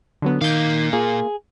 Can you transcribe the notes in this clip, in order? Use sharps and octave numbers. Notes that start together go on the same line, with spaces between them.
D3 F#3 B3
A#2 D#3 F5 D6 G6
A#3 F4 G#4